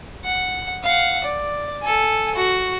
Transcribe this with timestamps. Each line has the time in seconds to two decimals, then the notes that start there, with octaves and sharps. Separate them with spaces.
0.25 F#5
0.84 F5 F#5
1.24 D5
1.82 A4 G#5
2.35 F#4